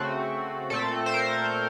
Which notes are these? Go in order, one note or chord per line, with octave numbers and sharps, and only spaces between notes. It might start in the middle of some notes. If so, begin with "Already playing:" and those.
Already playing: C#3 A3 C4 F#4
A#2 A3 C4 A4
C5
A#4